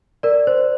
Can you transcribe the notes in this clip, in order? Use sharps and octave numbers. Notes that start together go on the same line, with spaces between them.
A#4 D5
C5